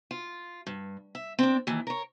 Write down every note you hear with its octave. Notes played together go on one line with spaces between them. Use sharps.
F4
G2
E5
C4 D4
D#2 E3
A#4 C#5